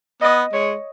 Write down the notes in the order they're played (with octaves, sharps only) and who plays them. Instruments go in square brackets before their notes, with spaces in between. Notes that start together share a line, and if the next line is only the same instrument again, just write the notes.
[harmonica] B3 [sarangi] D#5
[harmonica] G#3 [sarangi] C#5